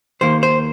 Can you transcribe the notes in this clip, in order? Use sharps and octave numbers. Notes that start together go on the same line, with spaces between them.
D#2 D#3 A#3 C5
C5